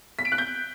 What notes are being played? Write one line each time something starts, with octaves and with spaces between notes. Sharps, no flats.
B6
D7
F#6
G6